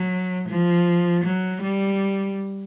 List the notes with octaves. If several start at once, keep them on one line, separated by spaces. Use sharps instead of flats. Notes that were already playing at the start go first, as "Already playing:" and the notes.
Already playing: F#3
F3
F#3
G3